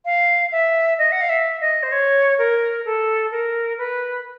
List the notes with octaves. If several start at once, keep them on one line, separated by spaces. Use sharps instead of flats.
F5
E5
D#5
F#5
F5
E5
D#5
C5
C#5
A#4
A4
A#4
B4